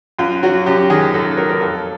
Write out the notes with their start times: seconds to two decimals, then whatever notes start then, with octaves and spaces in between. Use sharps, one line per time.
0.19 F#2 F4
0.43 F#3 F#4
0.66 F#2 G4
0.90 D#3 G#4
1.14 F#2 A4
1.37 F#3 A#4
1.49 A#4
1.61 F2 A4